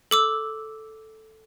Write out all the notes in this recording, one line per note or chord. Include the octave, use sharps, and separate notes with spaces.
A4 D6 E6